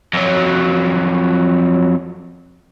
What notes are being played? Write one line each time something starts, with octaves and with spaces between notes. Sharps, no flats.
F2 F#3